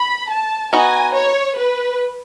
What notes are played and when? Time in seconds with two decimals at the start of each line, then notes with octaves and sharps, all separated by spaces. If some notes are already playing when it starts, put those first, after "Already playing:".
Already playing: B5
0.31 A5
0.73 B3 D#4 F#4 G#5
1.15 C#5
1.57 B4